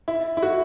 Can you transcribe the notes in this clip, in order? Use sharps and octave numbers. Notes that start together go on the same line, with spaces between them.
E4
E4
F#4